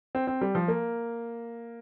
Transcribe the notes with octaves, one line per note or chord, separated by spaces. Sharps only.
C4
C4
G3
F3
A#3